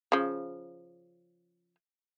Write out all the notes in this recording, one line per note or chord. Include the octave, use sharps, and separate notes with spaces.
C#3 F3